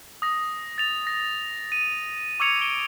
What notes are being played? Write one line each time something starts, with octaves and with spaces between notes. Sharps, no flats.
D#6 A#6
A6 F7
A#6
D#7
C#6 D6 E6 G#6 C#7 F7
C#7 D7 G7